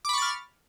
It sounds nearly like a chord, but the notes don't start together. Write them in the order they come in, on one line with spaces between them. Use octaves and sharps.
D6 B5 C#6 A6 F6